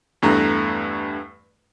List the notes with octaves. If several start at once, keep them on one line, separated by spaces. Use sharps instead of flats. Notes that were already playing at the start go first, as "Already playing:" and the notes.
E2 G2 A3 A#5